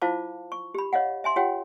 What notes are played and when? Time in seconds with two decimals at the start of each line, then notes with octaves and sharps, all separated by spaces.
0.02 E4 F4 C5 F5 A5 D6
0.52 C#6
0.74 G4 B5
0.93 C#5 D#5 F5 F#5
1.24 E5 G#5 C6
1.36 F4 G4 C#5 F#5 G5